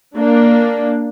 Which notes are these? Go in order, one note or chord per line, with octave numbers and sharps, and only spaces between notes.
A#3 D4